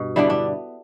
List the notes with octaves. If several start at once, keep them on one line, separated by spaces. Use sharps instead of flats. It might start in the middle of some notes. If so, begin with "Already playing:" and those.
Already playing: G2 B2
D3 G3 B3 D4 E4
D4